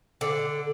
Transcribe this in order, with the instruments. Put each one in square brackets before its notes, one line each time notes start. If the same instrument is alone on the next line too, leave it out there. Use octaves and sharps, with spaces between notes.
[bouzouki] D3